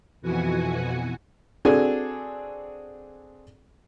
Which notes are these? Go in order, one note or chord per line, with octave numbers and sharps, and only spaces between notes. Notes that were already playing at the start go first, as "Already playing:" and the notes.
F2 B2 E3 F#4 F#5 G#5
C4 D4 F#4 G#4 A4 G#5